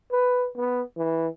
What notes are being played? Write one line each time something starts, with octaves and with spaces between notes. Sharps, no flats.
B4
B3
E3